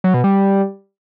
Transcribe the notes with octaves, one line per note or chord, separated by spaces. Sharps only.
F#3
B2
G3